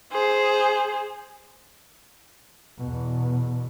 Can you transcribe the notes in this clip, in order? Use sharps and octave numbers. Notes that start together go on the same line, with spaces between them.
G#4 C5
E2 B2